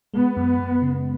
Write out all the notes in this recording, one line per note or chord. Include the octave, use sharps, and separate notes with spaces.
G#3 B3
F#2
F#2
C#3